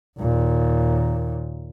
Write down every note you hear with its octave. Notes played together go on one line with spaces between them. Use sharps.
D#2 A#2